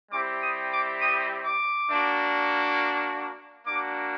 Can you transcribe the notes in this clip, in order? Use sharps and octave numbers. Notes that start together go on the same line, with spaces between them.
G3 C4 E4 G4 D6
D#6
D6
D#6
D6
A#3 D4 F#4
A#3 D4 F#4 D6